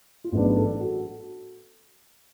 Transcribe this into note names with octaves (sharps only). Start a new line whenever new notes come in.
F4
A1 G#2 F#3 B3 D4 F#4
A4
F#4